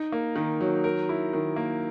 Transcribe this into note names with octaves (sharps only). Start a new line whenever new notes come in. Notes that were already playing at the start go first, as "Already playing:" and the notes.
Already playing: D#4
A#3
D#3
F#3
A#4
E4
D#3
A#3